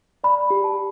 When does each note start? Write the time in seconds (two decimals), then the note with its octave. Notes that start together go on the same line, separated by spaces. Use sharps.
0.24 D5 B5
0.50 G4
0.64 A5